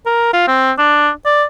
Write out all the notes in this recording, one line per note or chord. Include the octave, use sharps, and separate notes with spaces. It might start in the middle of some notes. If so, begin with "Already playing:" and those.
A#4
F4
C4
D4
D5